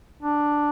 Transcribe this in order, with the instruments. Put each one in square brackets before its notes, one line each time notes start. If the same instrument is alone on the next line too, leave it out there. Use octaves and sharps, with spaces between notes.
[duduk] D4